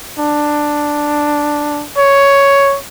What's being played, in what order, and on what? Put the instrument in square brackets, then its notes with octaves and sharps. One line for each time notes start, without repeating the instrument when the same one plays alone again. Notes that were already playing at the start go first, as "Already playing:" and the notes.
[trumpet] D4
C#5